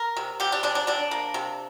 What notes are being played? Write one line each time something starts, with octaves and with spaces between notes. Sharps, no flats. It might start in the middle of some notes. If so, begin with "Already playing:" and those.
Already playing: A#4
C3
C3 G4
D4
C3 D4
D4
C3 D4
A#3
C3